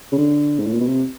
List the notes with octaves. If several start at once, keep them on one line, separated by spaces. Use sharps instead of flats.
C#3
D3
G#2
A2
A#2
B2
C3